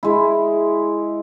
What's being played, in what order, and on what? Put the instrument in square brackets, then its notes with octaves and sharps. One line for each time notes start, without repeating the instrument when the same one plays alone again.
[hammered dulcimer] G#3 E4